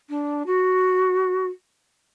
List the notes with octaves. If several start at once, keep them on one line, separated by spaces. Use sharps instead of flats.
D4
F#4